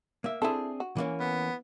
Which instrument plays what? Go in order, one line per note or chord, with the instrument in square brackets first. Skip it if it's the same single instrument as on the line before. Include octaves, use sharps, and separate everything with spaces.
[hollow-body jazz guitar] A#3 E5
[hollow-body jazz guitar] C4 D4 G#4 [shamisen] E4 A4
[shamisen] F#4
[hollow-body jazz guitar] E3 A#3 C#4
[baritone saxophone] B3